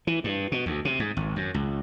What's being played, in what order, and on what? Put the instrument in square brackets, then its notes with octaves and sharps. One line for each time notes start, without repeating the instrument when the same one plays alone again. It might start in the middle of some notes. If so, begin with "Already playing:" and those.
[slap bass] E3
G2
B2
D2
C3
G#2
G#1
F#2
C#2